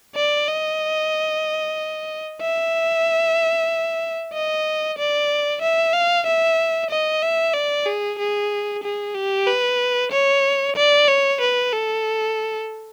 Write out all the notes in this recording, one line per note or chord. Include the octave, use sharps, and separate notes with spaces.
D5
D#5
E5
D#5
D5
E5
F5
E5
D#5
E5
D5
G#4
G#4
G#4
G4
B4
C#5
D5
C#5
B4
A4